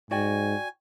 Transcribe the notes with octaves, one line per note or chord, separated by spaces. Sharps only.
G#2 F#4 D5 G5 G#5